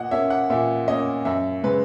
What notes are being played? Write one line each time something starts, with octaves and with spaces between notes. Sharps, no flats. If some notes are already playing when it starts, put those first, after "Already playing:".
Already playing: A#2 D#5 F#5
A#3 C#4 E5
F#5
A#2 E5
A#3 C#4 D#5
F#2 E5
C#3 G#3 B4